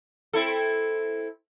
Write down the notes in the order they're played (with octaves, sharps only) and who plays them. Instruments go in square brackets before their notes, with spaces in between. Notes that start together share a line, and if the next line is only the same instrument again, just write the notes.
[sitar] C4 E4 A4